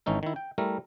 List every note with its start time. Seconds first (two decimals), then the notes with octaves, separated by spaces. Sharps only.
0.06 G#1 E3 C#4 D#4 A4
0.23 D#3 E4
0.36 G5
0.58 G3 A3 E4 A#4